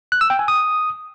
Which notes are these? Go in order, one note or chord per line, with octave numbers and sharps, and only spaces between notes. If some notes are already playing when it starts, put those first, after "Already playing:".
F#6
E6
G5
G#5
D#6